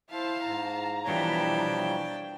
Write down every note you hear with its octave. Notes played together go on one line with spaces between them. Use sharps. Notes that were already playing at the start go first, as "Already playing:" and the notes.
E4 C5 F5 A5
G#2 A#5
B2 E3 F3 G3 D4 C#5 G5